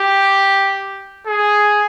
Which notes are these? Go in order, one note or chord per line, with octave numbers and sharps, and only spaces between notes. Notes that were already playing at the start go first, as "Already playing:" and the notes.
Already playing: G4
G#4